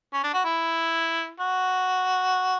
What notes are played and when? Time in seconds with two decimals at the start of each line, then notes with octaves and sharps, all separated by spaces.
0.13 C#4
0.24 D4
0.34 F#4
0.45 E4
1.40 F#4